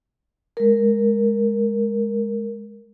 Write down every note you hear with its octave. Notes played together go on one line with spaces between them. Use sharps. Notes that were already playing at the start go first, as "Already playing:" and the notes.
G#3 A#4